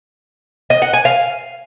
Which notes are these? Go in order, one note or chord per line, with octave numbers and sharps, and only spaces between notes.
D#5
F#5
G#5
F5